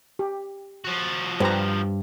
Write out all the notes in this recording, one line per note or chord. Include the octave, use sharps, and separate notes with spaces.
G4
F3 F#4
G2 G4 B4 C5 A#5